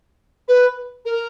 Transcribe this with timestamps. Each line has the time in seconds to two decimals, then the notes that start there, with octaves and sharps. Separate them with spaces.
0.48 B4
1.05 A#4